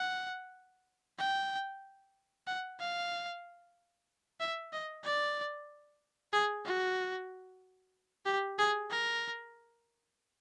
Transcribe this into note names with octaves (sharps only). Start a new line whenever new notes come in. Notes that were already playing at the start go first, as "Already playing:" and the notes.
Already playing: F#5
G5
F#5
F5
E5
D#5
D5
G#4
F#4
G4
G#4
A#4